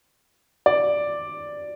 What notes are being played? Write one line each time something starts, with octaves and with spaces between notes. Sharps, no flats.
D5